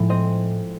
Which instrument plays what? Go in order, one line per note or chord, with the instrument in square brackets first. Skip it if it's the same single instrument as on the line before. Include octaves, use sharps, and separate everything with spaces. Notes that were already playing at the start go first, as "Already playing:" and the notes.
Already playing: [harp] A2 F3 G#3
C4 D#5